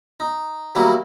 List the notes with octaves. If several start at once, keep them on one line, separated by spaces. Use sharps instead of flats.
D#4
D#3 F#3 G3 A#3 E4 F#4